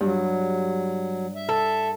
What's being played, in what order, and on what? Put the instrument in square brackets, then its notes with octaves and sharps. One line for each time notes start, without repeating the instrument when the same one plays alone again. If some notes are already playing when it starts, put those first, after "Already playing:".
[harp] G2 [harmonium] F#3
[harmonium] E5
[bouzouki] A4